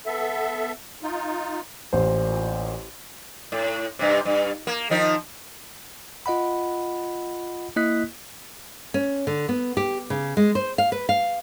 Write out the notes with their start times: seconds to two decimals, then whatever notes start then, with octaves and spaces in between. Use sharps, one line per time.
0.06 B3 A4 E5
1.03 D#4 F4
1.93 A1 A#2 C5
3.52 A2
3.99 G2 C3
4.25 G2
4.67 A#3
4.90 D#3 F3 D#4
6.26 F4 D#5 F#5 B5
7.76 A#3 E4 D#5 D#6 F#6 B6
8.94 C#4
9.27 D3
9.49 B3
9.77 G4
10.10 C#3
10.37 G#3
10.55 C5
10.78 F5
10.92 B4
11.09 F5